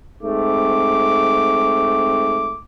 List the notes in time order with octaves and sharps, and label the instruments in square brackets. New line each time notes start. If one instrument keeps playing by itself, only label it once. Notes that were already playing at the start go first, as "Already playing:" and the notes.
[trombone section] G#2 A3 C4 [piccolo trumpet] D6